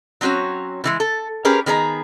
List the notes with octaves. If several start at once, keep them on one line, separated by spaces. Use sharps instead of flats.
F#3 C4 C#4 F#4 C#5
B2 E3 G#3
A4
C#4 G4 G#4 A#4 B4
D#3 B3 G#4 C5 A#5